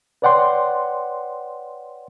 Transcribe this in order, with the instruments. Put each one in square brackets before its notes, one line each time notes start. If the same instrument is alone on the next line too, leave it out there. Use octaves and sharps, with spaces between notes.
[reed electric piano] B4 C#5 D5 F#5 G5 C6